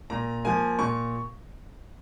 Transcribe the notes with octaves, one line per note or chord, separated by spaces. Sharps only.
A#2 A#5
F3 A#3 G#5
A#2 C#6